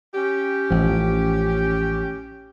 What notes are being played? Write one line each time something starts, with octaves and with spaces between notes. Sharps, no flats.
C#4 G4
A1 F3